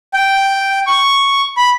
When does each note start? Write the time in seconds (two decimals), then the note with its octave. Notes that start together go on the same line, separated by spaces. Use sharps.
0.13 G5
0.87 C#6
1.57 B5